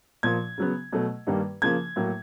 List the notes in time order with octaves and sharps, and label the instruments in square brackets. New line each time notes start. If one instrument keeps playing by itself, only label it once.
[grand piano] A#2 F3 A#3 G#6
C#3 F#3 B3
B2 F#3 A3
G2 D#3 G3 A#3
C#3 F3 A#3 G#6
A2 F#3 A#3